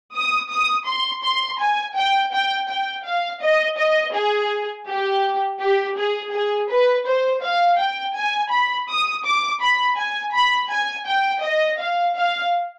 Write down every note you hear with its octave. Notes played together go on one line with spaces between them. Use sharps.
D#6
D#6
C6
C6
G#5
G5
G5
G5
F5
D#5
D#5
G#4
G4
G4
G#4
G#4
B4
C5
F5
G5
G#5
B5
D#6
D6
B5
G#5
B5
G#5
G5
D#5
F5
F5